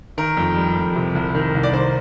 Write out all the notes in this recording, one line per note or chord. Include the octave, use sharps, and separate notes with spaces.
D#3 A#4
F2
G3
F2
C3
C2
D#3
C2
D5
D#3 C5